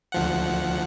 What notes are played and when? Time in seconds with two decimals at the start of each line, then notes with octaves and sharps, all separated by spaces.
0.12 D2 F3 F#5